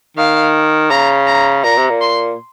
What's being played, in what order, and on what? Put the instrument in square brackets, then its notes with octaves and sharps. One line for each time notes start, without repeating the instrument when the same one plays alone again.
[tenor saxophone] D#3 [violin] F5
[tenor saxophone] C#3 [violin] A#5
[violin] A#5
[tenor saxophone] A#2 [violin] A#5
[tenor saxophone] C3
A#2
[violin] C6